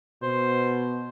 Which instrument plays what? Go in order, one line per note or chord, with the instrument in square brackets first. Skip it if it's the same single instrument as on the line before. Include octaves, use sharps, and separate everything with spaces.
[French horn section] B2 [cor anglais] C5